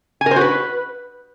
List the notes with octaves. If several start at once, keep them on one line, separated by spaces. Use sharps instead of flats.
G#5
A#4
C5
F#4
B4